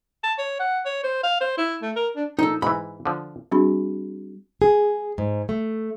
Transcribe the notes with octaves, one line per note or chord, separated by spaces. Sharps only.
A5
C#5
F#5
C#5
C5
F5
C5
E4
A3
A#4
D4
A#1 D#4 A4
G#2 E3 B5
D3 F3
G3 C4 D4 F#4 G#4 B5
G#4
G#2
A3